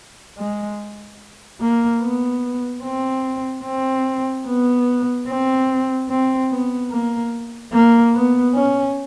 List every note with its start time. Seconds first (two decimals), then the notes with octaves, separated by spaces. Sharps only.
0.38 G#3
1.60 A#3
2.01 B3
2.84 C4
3.64 C4
4.46 B3
5.28 C4
6.09 C4
6.51 B3
6.91 A#3
7.73 A#3
8.14 B3
8.55 C#4